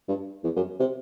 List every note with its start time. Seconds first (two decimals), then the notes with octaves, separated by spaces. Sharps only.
0.09 G2
0.44 E2
0.56 F#2
0.80 C3